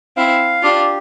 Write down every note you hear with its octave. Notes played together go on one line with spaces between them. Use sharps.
C4 E4 F5
D4 F4 G4